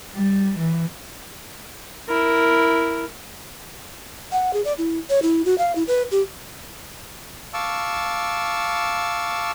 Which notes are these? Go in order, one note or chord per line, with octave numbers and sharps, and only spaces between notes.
G3
E3
E4 A#4
F#5
G#4
D5
E4
C#5
E4
F#4
F5
E4
B4
G4
F5 A5 C#6 D6 E6